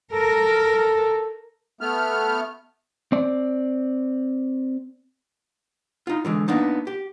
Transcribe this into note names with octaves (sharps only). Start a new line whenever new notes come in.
A4 A#4
A3 B3 F6
C4 D5
D#4 F4
D3 E3 G#3
A#3 B3 D4 D#4
G4